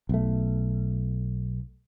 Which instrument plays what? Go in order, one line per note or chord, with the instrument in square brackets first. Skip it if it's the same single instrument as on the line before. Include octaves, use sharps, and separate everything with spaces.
[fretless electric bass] B1 A3